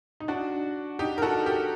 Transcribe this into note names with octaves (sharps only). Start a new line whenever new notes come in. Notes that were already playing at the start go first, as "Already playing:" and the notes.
D#4
D4 F#4
D#4 G4
A#4
F#4 A4
G4 A#4